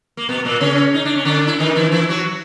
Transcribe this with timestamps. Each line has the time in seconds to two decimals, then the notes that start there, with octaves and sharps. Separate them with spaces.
0.17 A#3
0.29 B2 B3
0.45 A#2 A#3
0.61 C#3 C#4
0.94 D#4
1.05 D4
1.15 C#4
1.25 D3 D4
1.47 E4
1.59 D#3 D#4
1.76 E3 E4
1.92 E3 E4
2.09 F#3 F#4